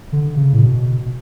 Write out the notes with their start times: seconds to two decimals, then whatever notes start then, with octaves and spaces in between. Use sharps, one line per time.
0.12 D3
0.37 C#3
0.53 A2
0.62 B2